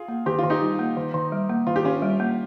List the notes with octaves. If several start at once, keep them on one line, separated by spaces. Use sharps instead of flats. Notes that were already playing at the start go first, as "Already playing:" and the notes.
Already playing: F4 G#4
A#3
D#3 G4
F4
D#3
D#4 G4
G3
A#3
D#3
D#3
G3
A#3
D#3 F4
G4
D#3 C#4 F4
G3
A#3